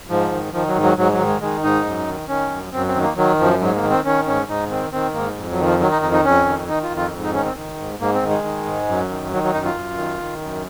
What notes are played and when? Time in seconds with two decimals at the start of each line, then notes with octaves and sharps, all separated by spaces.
0.09 G#2 F3
0.32 D#3
0.53 D#3 F3
0.67 F#3
0.75 G#2
0.83 F#3
0.97 G#2 F#3
1.13 F#3
1.19 D#3
1.27 G#3
1.41 D#3 G#3
1.64 G#2 D#4
1.85 F#2
2.07 D#3
2.29 D#3 C#4
2.51 F#2
2.72 F#2 C4
2.88 C4
2.95 D#3
3.03 A#3
3.17 D#3 F#3
3.39 F#2 F3
3.60 G#2 F#3
3.75 A#3
3.82 D#3
3.90 C4
4.05 D#3 C#4
4.27 G#2 C#4
4.48 G#2 D#4
4.70 D#3 C4
4.92 D#3 C4
5.14 G#2 A#3
5.37 F2
5.51 F#3
5.59 D#3
5.65 F3
5.80 D#3 F#3
5.91 D#4
6.02 F2 D#4
6.13 D#4
6.24 F2 C#4
6.46 D#3
6.68 D#3 D#4
6.83 F4
6.91 F2
6.97 F4
7.13 G#2
7.23 D#4
7.34 D#3 C#4
7.46 C4
7.56 D#3
7.78 G#2
7.99 G#2 A#3
8.14 C4
8.22 D#3
8.29 G#3
8.44 D#3
8.65 G#2
8.88 F#2
9.10 D#3
9.31 D#3 F#3
9.43 F#3
9.54 F#2 D#4
9.65 F4
9.75 F#2
9.97 D#3
10.19 D#3
10.41 F#2